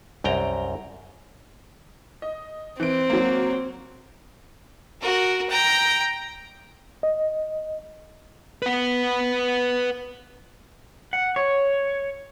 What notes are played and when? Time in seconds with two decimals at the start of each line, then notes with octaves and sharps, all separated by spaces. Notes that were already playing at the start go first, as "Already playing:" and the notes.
0.24 C2 F#2 G5 A#5
2.22 D#5
2.80 E3 C4 D7
3.10 F#3 A#3
5.01 F#4 A#4
5.49 G5 A#5
7.03 D#5
8.62 B4 F#5
11.13 F#5
11.36 C#5